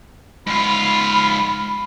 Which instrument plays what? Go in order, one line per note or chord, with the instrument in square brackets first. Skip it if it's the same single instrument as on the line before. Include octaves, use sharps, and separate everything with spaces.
[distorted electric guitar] G#2 F4 [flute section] B5